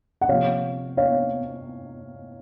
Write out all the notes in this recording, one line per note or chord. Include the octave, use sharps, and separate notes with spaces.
F#5
C3 F3 A#3 F4 C#5 F5
C#5 F5